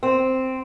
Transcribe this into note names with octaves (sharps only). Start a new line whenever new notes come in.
C4